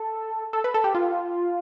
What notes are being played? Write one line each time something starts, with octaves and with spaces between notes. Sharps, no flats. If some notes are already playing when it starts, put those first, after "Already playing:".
Already playing: A4
A4
B4
A4
G4
F4